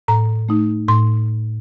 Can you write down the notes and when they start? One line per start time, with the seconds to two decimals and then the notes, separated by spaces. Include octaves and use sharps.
0.08 A2 A#5
0.49 A3 D#4
0.88 A2 C6